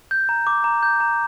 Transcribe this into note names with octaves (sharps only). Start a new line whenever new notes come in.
G6
A#5
D6
A#5
G6
A#5